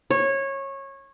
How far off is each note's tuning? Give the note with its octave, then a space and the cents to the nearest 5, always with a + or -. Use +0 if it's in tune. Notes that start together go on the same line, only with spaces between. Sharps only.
C#5 -20